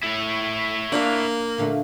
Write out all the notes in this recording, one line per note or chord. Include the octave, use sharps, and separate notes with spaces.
A2 E4 C#5
A#3 D4 F5
A#2 D3 A3